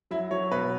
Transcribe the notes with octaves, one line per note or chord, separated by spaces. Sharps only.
F#3 E4
F#3 C#5
B2 B4